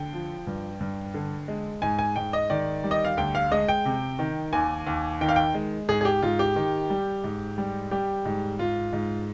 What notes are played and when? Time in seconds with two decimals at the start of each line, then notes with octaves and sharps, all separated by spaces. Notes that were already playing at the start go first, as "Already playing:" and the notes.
Already playing: D3 G5
0.13 F3
0.47 G2
0.80 G2
1.14 D3
1.48 G#3
1.82 G#2 G#5
1.99 G#5
2.16 G#2 G5
2.33 D#5
2.50 D#3 D5
2.84 G3
2.91 D#5
3.05 F5
3.17 D2 G5
3.35 F5
3.52 G#3 D#5
3.68 G5
3.85 C3
4.19 D#3
4.53 D#2 G#5
4.87 D#2
5.21 D#3 G5
5.29 F5
5.36 G5
5.54 G#3
5.89 G#2 G#4
6.01 G#4
6.05 G4
6.22 G#2 F4
6.39 G4
6.56 D#3
6.90 G3
7.24 G#2
7.58 G3
7.91 G3 G4
8.25 G#2
8.59 G#2 F4
8.93 G#2